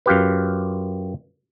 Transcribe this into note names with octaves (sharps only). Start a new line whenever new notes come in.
F#2 F4 G4 B4